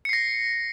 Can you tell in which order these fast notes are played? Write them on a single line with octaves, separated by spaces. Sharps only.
C#7 C7 A#6